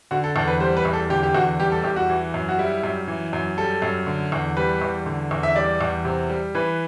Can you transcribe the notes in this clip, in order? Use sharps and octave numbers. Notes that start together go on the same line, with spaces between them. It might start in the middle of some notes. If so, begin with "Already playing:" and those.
D3 F#4
A4
E2 A4
B4
G3 C5
B4
E2
A4
D3 G4
G4
E2 F#4
G3 G4
A4
E2 G4
F#4
E3
F#2
F#4
G3 E4
F#2
E3
F#2
G3 A4
F#2
D3
E2
G3 B4
E2
D3
E2
E5
G3 D5
E2
C3
G3
E3 B4